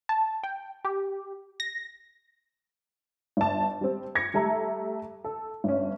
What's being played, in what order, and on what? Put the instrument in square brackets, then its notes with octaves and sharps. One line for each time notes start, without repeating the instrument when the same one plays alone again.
[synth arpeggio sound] A5
G5
G4
A#6
[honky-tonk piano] G1 A5
G3 C4
G#6 A#6 C#7
G3 A3 A4 A#5
A4
G1 C#4